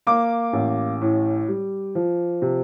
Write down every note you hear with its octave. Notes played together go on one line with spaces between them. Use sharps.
A#3 D6
A1
A2
G3
F3
C3